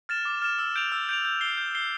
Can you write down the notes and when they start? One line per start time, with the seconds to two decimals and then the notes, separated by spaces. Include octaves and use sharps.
0.09 F6 A6 E7
0.25 D6
0.42 F6 A6 E7
0.59 E6
0.76 G6 D7 F7
0.92 E6
1.09 G6 D7 F7
1.25 G6
1.41 C7 G7
1.57 G6
1.75 C7 G7